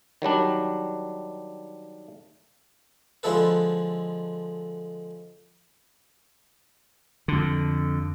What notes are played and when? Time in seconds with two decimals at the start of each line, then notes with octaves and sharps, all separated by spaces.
0.22 D#3 F#3 G3 D4
3.23 D3 F3 G#3 E4 A4 B4
7.28 F2 D3